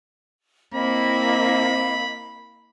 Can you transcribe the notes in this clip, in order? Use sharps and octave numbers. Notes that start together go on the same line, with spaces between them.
A#3 C4 E4 A#4 D#5 F5 B5